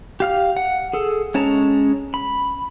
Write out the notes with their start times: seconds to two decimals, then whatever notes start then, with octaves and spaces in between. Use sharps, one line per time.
0.20 G4 F5 F6
0.57 F#5
0.93 G#4 A4
1.34 G#3 C#4 C#5 A5 A#5
2.14 B5